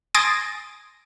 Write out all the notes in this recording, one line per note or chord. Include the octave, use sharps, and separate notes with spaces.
G#5 C6 D#6 A6 A#6 D7